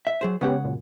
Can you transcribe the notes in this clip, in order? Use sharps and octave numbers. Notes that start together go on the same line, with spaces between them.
E5
F#3 G#4 C5
C#3 G#3 B3 C#4 G4 F#5
F#2 A#2